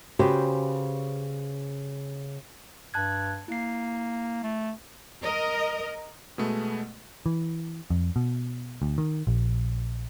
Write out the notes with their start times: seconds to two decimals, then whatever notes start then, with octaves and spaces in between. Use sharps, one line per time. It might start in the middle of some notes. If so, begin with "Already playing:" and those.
0.19 C#3 F#4 G4 B4 C5
2.94 G2 A5 F#6 G#6
3.48 A#3 E4 C7
4.43 A3
5.22 A#4 D#5
6.38 B2 G#3 A3 B3
7.26 E3
7.90 F2
8.16 B2
8.82 D2
8.98 D#3
9.27 A#1